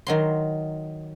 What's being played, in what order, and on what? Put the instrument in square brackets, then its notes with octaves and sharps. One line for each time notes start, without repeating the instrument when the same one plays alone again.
[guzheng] D#3 F#3 C6